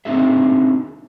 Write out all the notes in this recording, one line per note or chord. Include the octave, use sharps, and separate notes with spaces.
C4 D4 D#4 F#4 G#4 E5